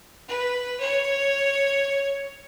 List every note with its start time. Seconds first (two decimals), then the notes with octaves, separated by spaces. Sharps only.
0.28 B4
0.80 C#5